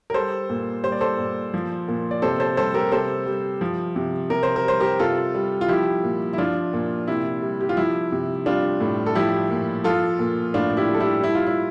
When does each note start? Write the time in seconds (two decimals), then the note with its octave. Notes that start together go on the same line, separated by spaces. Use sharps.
0.10 A#4
0.14 G3 A4 C5
0.49 A#2
0.84 G3 C5
0.92 D5
1.01 A4 C5
1.19 A#2
1.54 F3
1.88 A#2
2.11 D5
2.22 C3 A4 C5
2.40 A4 C5
2.57 G3 A4 C5
2.74 G4 A#4
2.92 C3 A4 C5
3.26 G3
3.61 F3
3.96 C3
4.30 C3 A#4
4.43 C5
4.56 A#4
4.65 G3 C5
4.80 G4 A#4
4.99 C3 F4 A4
5.35 G3
5.61 F4
5.68 F3 E4 G4
6.04 A#2
6.33 E4
6.38 F3 D4 F4
6.73 A#2
7.08 C3 E4
7.42 G3
7.61 G4
7.69 F4
7.77 F3 E4
8.12 C3
8.46 G3 D4 F4
8.81 A2
9.06 A4
9.15 F3 E4 G4
9.51 A#2
9.84 F3 F4 A4
10.19 A#2
10.54 A2 D4 F4
10.77 E4 G4
10.89 G3
10.94 A4
11.00 E4 G4
11.23 G3 E4
11.35 F4
11.46 E4